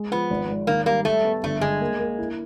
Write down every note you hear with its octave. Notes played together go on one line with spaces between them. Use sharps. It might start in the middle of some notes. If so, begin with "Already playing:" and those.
Already playing: G#3
F3 B3
G#1
G#2
D#3 A#3
G3 A#3
G3 A3
B3
G1 A3
G1 G#3
A#3
A#3
E4